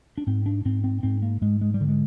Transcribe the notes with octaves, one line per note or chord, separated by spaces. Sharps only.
D4
G#2 C4
D4
G#2 C4
C4
G#2 C4
A#3
G#2 G#3
G#3
G3
D3
G#3